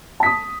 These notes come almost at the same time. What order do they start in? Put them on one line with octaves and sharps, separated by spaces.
A5 B6 D#6